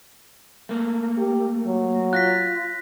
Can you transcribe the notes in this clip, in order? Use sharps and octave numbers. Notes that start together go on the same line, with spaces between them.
A3 A#3
G4
F#3
F4 F#6 A#6 B6